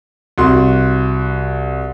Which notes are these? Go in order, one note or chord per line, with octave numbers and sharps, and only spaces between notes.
C2 F#4 C6